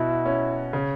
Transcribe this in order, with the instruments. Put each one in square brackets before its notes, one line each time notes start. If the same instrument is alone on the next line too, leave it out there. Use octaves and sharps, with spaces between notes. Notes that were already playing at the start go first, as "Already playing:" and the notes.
Already playing: [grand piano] B2 F#4 [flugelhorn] E4
[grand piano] C#4
C#3